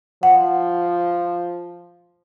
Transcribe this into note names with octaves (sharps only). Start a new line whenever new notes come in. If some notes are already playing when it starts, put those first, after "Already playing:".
F3 F#5